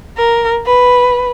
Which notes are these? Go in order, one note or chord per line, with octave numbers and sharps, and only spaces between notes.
A#4
B4